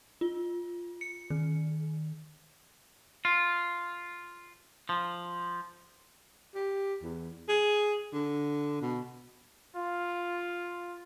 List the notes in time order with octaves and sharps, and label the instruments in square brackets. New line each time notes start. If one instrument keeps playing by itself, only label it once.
[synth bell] F4
C#7
D#3
[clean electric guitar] F4
F3
[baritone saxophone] G4
E2
G#4
D3
B2
[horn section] F4